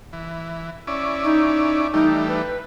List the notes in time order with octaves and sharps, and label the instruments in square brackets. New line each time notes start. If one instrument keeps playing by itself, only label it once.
[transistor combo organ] E3
C#4 E4 D5
[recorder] D#4
[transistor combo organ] E3 G3 A3 [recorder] D#4
[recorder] B4